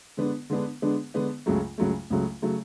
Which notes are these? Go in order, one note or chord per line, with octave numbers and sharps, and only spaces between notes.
D3 G#3 B3 D4
D3 G#3 B3 D4
D3 G#3 B3 D4
D3 G#3 B3 D4
C#2 C#3 F#3 A3
C#2 C#3 F#3 A3
C#2 C#3 F#3 A3
C#3 F#3 A3